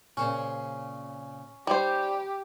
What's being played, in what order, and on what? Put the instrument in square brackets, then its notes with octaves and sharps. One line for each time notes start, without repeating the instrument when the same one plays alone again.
[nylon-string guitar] A#2 C#3 C4 [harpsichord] C#4
[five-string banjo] G3 C5 [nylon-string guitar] D#4 [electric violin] G4